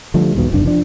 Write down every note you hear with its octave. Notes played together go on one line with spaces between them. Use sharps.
D3 F3 G3 A3
B1 E2 G#2 B2
F#1 C2 G2 D4
F3 D4